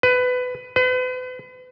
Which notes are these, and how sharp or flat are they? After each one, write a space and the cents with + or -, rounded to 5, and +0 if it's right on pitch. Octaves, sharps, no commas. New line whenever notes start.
B4 +20
B4 +40